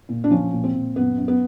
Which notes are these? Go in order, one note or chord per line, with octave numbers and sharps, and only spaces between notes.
A#2
D4
F3 C#4
A#2
C4
A#2
F#2 B3
F#2
B3